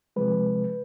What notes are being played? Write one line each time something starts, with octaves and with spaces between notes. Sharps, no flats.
C3 F3 G#3 B4